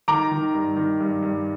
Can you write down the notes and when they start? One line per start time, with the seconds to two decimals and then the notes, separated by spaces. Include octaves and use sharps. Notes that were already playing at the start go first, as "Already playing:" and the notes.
0.08 D#3 A#5 D6
0.31 D#3
0.54 G2
0.76 D#3
1.00 G2
1.23 G2